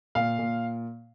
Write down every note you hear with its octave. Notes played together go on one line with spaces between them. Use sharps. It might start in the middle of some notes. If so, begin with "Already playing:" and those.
A#2 F5
A#2